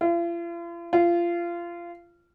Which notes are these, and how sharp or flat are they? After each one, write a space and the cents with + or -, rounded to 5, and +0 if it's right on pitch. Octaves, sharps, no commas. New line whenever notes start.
F4 -45
F4 -25